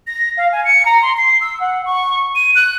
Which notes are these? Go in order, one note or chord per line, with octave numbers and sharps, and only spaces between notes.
A#6
F5
G#5
C#7
A#5
C6
C7
E6
F#5
C#6
D#7
F#6